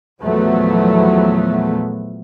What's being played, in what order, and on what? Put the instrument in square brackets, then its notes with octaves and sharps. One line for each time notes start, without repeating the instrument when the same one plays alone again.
[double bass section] E2 A#2 F3 F#3 A3 B3